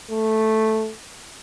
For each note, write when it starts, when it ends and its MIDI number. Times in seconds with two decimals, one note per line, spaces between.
0.11 0.91 57